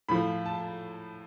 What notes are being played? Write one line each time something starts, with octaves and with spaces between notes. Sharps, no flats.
A2 F3 B5
A5